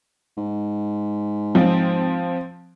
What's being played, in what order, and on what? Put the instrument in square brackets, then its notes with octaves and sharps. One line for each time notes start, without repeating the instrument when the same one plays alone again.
[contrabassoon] G#2
[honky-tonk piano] F3 C4